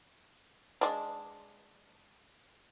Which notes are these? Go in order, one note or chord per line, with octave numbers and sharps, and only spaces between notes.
G#3 D4